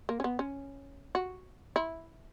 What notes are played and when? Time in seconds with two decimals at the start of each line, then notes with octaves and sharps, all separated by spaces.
0.09 A#3
0.20 C#4
0.24 B3
0.39 C#4
1.15 F#4
1.76 E4